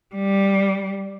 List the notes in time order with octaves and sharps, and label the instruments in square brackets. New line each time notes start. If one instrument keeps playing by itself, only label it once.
[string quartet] G3